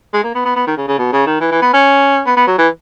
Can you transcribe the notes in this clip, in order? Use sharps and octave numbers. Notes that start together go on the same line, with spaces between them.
G#3
A#3
B3
B3
B3
D#3
C#3
C#3
B2
C#3
D#3
E3
E3
B3
C#4
B3
B3
F#3
E3